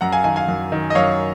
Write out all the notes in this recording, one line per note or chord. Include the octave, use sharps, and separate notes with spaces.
F#2 F#5 A#5
F5 G#5
D#3 F5 G#5
F5 G#5
F#2
D#3
D#5
F#2 C#5 F5